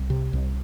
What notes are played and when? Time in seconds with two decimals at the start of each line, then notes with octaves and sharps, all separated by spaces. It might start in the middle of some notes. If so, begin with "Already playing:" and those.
Already playing: C2
0.10 C3
0.33 C2